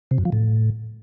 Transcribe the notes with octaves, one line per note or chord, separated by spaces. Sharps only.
C3
F#2
F3
A2